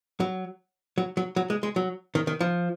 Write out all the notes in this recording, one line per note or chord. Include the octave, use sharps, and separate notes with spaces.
F#3
F#3
F#3
F#3
G#3
G#3
F#3
D#3
D#3
F3